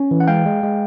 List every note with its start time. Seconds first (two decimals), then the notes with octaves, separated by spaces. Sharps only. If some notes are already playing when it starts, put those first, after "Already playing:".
Already playing: C#4
0.11 E3
0.20 F#5
0.28 G#3 F5 G5
0.46 G#3
0.63 G#3